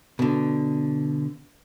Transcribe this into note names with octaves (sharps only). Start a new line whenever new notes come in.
B2 D3